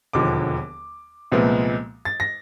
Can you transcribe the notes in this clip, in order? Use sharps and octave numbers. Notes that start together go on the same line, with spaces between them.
E1 D#2 D3 F3 D6
C2 A#2 F3 G#3 B3
A6
A#6